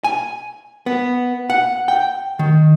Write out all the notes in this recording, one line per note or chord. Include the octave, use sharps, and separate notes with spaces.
G#5
B3
F#5
G5
D#3